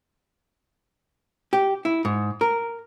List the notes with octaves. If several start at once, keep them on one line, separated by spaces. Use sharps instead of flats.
G4
E4
G#2
A#4